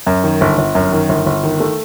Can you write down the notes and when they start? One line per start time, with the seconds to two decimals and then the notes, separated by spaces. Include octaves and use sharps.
0.07 F#2
0.24 D#3
0.41 G1
0.58 G1
0.75 F#2
0.92 D#3
1.09 G1
1.26 G1
1.43 D#3
1.60 A3